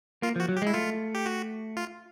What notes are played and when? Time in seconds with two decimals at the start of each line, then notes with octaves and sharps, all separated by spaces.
0.22 A#3 F4
0.36 F3
0.40 F#4
0.49 F#3
0.57 G4
0.62 G#3
0.66 E4
0.74 A3 F4
1.15 G4
1.26 F#4
1.77 F4